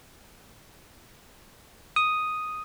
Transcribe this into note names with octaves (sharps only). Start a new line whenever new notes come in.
D#6